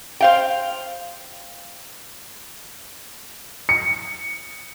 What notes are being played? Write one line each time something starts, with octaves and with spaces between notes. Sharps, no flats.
C5 F5 G5
C#7